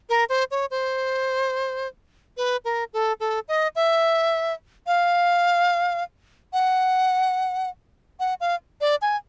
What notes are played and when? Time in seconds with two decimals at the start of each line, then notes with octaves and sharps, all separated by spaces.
0.09 A#4
0.29 C5
0.51 C#5
0.71 C5
2.37 B4
2.65 A#4
2.93 A4
3.20 A4
3.48 D#5
3.76 E5
4.87 F5
6.53 F#5
8.20 F#5
8.40 F5
8.81 D5
9.02 G#5